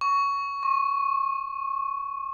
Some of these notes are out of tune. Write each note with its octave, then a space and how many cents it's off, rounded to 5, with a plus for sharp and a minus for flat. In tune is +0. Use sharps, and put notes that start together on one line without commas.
C#6 +15
C#6 -40